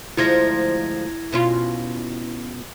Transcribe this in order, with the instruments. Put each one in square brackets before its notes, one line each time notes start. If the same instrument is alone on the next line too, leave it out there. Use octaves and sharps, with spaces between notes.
[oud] D2 F3 G#3 [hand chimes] E4 G#6 A#6
[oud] B2 C#4 F4